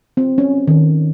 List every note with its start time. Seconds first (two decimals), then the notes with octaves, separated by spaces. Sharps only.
0.17 C4
0.38 C#4
0.67 D#3